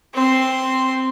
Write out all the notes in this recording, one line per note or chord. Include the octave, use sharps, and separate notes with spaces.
C4 C6